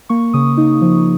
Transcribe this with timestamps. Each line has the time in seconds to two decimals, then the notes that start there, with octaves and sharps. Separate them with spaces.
0.09 A#3 C#6
0.33 C#3 D#6
0.57 D#4
0.81 F3